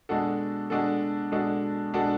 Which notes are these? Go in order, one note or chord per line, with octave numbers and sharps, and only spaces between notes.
B2 G#3 D4 F#4 A4
B2 G#3 D4 F#4 A4
B2 G#3 D4 F#4 A4
B2 G#3 D4 F#4 A4